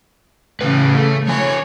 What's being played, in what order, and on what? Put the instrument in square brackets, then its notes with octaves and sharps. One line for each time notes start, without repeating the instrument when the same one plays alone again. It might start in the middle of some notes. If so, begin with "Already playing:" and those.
[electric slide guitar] A2 B4 [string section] C#3 E3
[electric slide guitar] A3
[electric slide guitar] F3 G#5 [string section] C#5